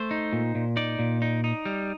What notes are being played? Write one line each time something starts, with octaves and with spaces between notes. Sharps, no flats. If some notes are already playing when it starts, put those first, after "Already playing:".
Already playing: A3 C5
D#4
A#2
A#2
D#4 D5
A#2
D#4
D#4
G3